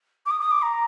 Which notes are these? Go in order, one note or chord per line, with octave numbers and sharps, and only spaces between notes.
D6
D#6
D#6
D6
A#5